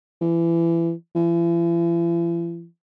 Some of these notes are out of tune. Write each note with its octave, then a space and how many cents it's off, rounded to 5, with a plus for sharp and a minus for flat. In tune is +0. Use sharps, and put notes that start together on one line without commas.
E3 +25
E3 +45